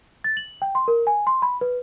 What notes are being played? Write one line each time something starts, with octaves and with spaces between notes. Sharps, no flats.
A6
F#7
G5
C6
A#4
G#5
C6
B5
B4